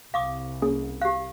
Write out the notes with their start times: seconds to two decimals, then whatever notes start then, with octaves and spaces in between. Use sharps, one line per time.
0.14 C2 F5 D6 D#6
0.62 A#3 C#4 G#4
1.01 G4 F5 F#6